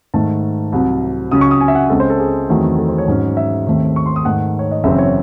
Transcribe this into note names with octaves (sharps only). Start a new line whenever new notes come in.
G#2 D#3 A3 A5
C2 C3 F#3
C#2 C#3 F#3 C#4 D#6
C#6
D#6
G#5
E5
F#5
C#2 C#3 G#3 C4 A4
C5
A4
G#4
E2 D#3 F#3 A3 C4
A4
C5
C#5
G#2 F#3 C#4
E5
D#2 D#3 A3 C4
C#6
C6
D#6
G#2 D#3 A3 F#5
C#5
D#5
F#1 F#2 E3 C4 E5
C#5